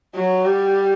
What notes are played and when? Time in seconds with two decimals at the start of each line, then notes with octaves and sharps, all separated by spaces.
0.15 F#3
0.45 G3